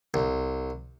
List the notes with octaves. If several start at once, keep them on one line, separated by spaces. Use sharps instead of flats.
C2